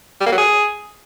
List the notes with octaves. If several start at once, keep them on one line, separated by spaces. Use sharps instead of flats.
G3
A#3
F#3
G#4